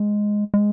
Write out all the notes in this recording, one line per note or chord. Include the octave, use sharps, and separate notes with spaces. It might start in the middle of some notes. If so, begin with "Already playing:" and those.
Already playing: G#3
G#3